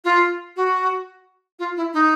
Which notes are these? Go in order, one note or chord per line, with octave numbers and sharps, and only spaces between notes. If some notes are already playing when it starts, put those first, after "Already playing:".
F4
F#4
F4
E4
D#4